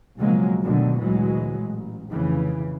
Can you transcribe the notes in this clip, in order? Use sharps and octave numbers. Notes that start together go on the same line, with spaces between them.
B1 C#3 F3 F#3 G#3 A#3
G1 D2 B2 D3 D#3 F#3
D2 A#2 E3 F#3 G#3
A1
F1 C#3 E3